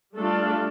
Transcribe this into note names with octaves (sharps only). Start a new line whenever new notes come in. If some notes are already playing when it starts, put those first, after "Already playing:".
G3 A3 D4 F4 A4